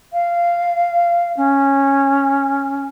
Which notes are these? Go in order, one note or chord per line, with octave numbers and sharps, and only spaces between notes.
F5
C#4